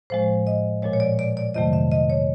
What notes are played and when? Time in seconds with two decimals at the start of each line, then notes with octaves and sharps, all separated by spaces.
0.10 A2 F3 G#3 C5
0.47 D#5
0.82 A#2 F3 G#3 C#5
0.93 C#5
1.00 D5
1.19 D5
1.37 D5
1.54 F2 C3 D#3 F#3 A3 D#5
1.73 E5
1.92 D#5
2.10 C#5